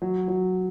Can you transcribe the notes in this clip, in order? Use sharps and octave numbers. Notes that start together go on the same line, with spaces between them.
F#3
F#3